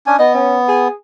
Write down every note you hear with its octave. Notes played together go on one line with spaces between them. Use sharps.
C#4 D4 G#5
B3 D#5
C#4
G#4